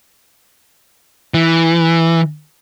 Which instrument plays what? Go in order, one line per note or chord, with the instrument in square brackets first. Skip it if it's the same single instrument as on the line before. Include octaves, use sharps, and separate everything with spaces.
[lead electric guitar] E3